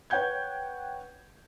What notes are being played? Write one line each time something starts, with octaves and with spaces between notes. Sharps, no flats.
B4 C#5 F#5 G5 G6 G#6